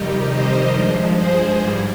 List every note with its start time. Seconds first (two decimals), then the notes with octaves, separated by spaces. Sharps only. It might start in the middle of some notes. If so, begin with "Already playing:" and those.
Already playing: F2 C3 D#3 G3 D#4 G4
0.30 C5 D#5
0.73 G2 F3 G#3
1.16 G#4 C5
1.59 G#2 G3